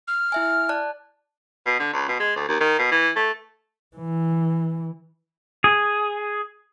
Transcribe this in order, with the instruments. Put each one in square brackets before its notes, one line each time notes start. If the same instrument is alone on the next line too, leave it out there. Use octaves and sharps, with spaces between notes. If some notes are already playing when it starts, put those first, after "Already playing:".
[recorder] F6
[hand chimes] E4 E5 G#5
D5 A5 F#6
[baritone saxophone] B2
D3
C#2
B2
G#3
D2
D#2
D#3
B2
E3
A3
[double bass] E3
[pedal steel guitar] G#4